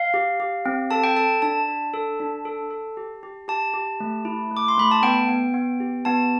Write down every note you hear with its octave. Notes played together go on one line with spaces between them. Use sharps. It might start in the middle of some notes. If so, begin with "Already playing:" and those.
Already playing: F5
G4
G4
C4
A4 A5
G5
A4 A5
D4 A5
D4
A4
D4
A4
A4
G4
G4
G4 A5
G4
A3
E4
A3
D6
C6
A3 B5
A5
B3 G5
B3
B3
G4
B3 A5